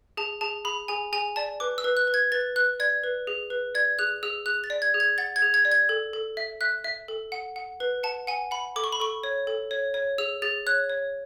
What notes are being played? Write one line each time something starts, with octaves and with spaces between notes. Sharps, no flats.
G#4 A5
G#4 A5
G#4 B5
G#4 G#5
G#4 G#5
D5 A5
B4 D6
E6
B4
F#6
B4
G#6
B4 A6
B4 F#6
D5 G#6
B4
G#4
B4
D5 G#6
G#4 F#6
G#4 E6
G#4 F#6
A6
D5
G#6
G#4
G#6
F#5 A6
G#6
G#4
G#6
D5
G#6
A4
A4
E5
E5 F#6
E5
A4
F#5
F#5
B4
F#5 A5
F#5 G#5
F#5 B5
A4 D6
C#6
B5
A4 C#6
C#5
A4
C#5
C#5
G#4 E6
G#4 A6
C#5 F#6
C#5